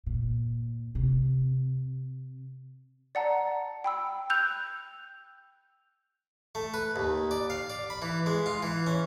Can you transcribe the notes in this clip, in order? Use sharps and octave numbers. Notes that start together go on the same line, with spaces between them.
A#2
C3
D5 F#5 A5 A#5
G5 B5 E6
E6 F#6 G6 F7
A3
B4
D#2
D5
F5
D5
B5
E3
G#3
F4
E3
C#4